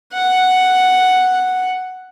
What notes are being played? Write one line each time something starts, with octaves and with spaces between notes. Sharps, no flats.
F#5